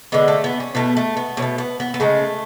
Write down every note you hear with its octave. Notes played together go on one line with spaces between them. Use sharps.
D3 G#3 B3
A3
B3
C#4
B2 A3 B3
A3
B3
B2 C#4
A3
B3
B3
B3
C#3 G#3 A3